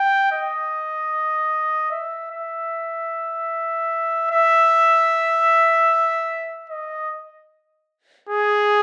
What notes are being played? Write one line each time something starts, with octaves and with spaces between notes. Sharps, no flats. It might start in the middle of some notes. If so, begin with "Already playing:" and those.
Already playing: G5
D#5
E5
E5
E5
D#5
G#4